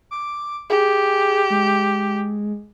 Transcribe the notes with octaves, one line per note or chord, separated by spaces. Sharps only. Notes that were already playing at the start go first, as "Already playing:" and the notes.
D6
G4 G#4
G#3